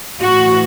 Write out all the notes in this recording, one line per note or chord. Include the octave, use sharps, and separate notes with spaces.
A2 E3 F#4